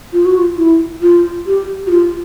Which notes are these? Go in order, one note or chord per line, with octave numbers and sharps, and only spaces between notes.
F4
F#4
F4
E4
F4
G4
F#4
F4